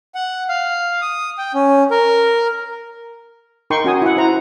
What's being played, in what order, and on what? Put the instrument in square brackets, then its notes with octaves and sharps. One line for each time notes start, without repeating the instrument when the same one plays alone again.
[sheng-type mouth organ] F#5
F5
D#6
G5
C#4
A#4
[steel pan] D#4 A#4 G5 C6 C#6
C#4 F#4 G#5 D#6
E4 F#5
E4 C5 A#5